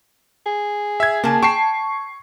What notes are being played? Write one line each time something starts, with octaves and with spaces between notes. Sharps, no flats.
G#4
E5 G#6
C#3 A#3 A5
G5 A5 C#6 C7